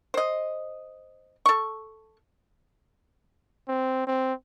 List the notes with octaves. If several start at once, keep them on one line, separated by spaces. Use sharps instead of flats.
C5 D#5
A4 C#6
C4
C4